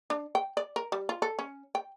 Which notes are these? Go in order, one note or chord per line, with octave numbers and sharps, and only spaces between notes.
D4
G5
D5
A#4
G3
F4
A4
C#4
G5